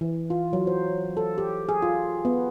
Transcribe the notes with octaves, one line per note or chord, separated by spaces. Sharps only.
E3
F4
F#3
C5
A4
G4
G#4
F4
B3